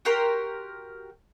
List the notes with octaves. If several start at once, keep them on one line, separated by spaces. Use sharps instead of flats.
F#4 G4 A#4 C6